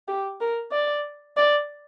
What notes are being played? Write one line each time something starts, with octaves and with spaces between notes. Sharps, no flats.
G4
A#4
D5
D5